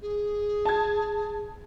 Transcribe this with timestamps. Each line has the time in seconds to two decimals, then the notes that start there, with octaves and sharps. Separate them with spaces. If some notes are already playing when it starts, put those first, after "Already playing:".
0.01 G#4
0.65 A5 G#6